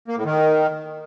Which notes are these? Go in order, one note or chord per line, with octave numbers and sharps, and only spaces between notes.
A#3
A2
D#3